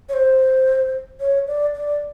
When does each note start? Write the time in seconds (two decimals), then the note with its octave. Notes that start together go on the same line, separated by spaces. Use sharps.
0.09 C#5
0.13 C5
1.20 C#5
1.48 D5
1.75 D5